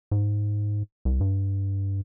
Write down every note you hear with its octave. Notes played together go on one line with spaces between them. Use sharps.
G#2
C2
G2